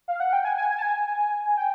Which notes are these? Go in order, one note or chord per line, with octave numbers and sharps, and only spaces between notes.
F5
F#5
G5
G#5
G#5
G#5
A5
G#5
G5